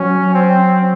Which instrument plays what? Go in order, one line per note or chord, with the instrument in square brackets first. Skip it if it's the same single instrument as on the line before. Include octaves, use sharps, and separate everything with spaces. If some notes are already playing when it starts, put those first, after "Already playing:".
Already playing: [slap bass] F#3 [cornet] C#4
[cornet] C4